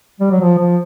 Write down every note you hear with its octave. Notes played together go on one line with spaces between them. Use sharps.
G3
F#3
F3
F3